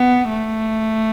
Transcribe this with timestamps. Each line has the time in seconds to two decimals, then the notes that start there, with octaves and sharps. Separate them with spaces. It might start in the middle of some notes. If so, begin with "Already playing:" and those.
Already playing: B3
0.28 A3